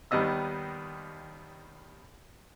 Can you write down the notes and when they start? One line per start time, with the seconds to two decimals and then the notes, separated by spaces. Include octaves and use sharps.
0.11 D#2 D#3 G3 B3 D#5 E6